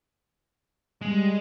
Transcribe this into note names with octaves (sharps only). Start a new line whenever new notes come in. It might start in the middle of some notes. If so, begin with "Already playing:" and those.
G3 G#3